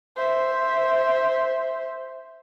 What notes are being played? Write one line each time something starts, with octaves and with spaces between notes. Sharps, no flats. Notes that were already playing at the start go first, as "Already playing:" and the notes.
C5 E5